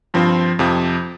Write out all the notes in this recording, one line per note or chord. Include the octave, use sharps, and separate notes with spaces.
G2 F3 C4 F4 C5
F2 C3 F3